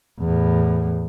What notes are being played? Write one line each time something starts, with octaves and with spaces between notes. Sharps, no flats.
E2 A2